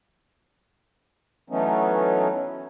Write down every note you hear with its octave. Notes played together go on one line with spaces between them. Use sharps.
E3 F#3 A3 B3 C#4 D#4